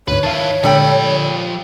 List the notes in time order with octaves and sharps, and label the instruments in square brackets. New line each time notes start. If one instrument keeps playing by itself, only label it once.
[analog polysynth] D2 G#2 [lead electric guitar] B4 [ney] C#5
[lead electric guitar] D#3 E4 [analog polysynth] F5 A5
[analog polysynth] A#2 D3 G#3 [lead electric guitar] F3 B5 [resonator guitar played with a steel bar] G3 A4 G5